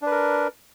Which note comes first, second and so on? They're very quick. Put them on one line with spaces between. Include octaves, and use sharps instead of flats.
D4 B4 A#4